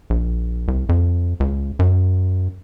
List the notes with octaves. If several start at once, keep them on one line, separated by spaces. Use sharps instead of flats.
A#1
C2
F2
C#2
F#2